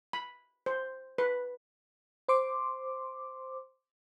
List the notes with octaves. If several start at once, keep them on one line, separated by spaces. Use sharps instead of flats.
B5
C5
B4
C5 C6 D6